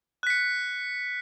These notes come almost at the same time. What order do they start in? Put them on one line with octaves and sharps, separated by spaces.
F#6 B6 C#7